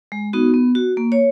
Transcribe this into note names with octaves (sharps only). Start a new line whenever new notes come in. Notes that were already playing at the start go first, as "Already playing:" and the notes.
G#3
B3 D#4 F#4
B3
F#4
A#3
C#5